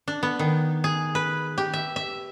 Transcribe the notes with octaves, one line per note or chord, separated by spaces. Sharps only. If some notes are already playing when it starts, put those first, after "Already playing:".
D4
B3
D#3
G#4
B4
G4
E5
E5